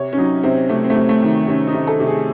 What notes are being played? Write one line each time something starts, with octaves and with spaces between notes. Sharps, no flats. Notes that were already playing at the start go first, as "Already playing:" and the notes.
Already playing: C3 C#5
C#4
F#3 D#4
C3 C4
C3 A3
C4
A3
C3
A3
D#3
C3 C#4
D#4
C3
A4
C3
G#4